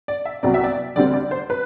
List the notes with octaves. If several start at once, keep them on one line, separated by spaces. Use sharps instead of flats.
D5
E5
C2 C3 F#3 B3 D5
E5
D5
D2 D3 G3 C4 D5
D5
C5
B4